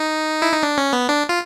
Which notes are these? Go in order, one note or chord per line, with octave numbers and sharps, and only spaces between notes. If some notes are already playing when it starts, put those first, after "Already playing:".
Already playing: D#4
E4
D#4
D4
C#4
B3
D4
F4